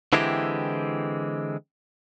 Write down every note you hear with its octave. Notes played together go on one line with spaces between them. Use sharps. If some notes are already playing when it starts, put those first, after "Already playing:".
D3 E3 G#3 C4 E4 G4